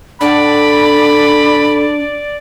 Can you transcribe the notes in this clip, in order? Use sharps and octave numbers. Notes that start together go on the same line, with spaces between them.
A2 D4 A4 D5 F#5 B5